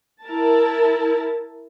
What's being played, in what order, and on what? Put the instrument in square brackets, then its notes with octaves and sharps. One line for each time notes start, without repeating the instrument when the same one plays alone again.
[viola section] E4 A#4 A5